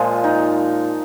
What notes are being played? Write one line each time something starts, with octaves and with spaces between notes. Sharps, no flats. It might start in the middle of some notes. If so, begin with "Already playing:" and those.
Already playing: A#2 F3 G#3
D#4